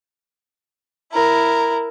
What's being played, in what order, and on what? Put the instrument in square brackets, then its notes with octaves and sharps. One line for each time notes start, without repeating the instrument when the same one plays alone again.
[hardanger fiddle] E4 A#4